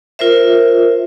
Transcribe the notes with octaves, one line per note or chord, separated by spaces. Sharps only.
F4 A#4 C5 E5